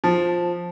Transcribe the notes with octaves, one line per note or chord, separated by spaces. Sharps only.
F3